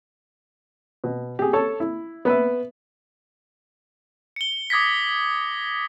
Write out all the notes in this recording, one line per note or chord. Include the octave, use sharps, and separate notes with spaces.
B2
G4 G#4
A4 C#5 A5
E4
B3 B4 E5
C#7 G7
D6 D#6 G#6 A#6 B6